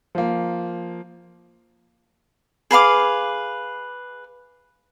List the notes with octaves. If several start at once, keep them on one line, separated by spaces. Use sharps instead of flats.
F3 A#3
G#4 B4 F5 D6